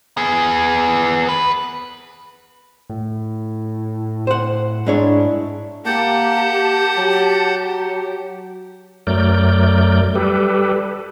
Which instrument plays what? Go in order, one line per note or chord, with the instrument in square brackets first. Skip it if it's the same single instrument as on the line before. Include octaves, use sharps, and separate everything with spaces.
[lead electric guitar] B3 G#4
B4
[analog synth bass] A2
[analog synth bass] A2 [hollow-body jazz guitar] C5 F#5
[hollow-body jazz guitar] G#2 D4 C#5 [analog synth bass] E4
[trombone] A#3 [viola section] G4 [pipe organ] F#5 G6 [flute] A5
[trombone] F#3
[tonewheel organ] F#2 F#3 A3 A#4 D5 G6
G3 G4 A4 B4